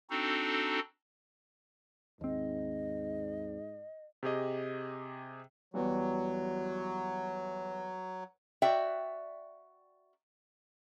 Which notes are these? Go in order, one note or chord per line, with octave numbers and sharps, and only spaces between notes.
C4 D4 D#4 F#4 A4
D#2 G#2 C4 D#5
C3 G4 G#4 D#5
E2 F#3 G3
F#4 D5 E5 G5